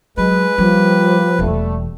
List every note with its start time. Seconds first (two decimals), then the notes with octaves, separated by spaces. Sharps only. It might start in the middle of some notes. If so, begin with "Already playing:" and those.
0.17 F#3 G#3 B4
0.58 F3 G3 A#3 G4
1.39 E1 E3 G3 A3